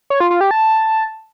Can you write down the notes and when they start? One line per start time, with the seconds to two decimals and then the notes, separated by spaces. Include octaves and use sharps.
0.10 C#5
0.20 F4
0.31 F4
0.41 G4
0.51 A5